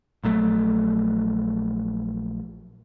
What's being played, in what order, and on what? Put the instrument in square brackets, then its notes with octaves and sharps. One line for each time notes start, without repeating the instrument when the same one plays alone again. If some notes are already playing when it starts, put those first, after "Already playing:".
[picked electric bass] A#1 F#3 A3